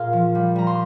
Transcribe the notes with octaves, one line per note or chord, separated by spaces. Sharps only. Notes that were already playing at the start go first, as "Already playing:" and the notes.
Already playing: A#2 G#4 D#5 F5 C6
F3
G3
G3 A#5
C6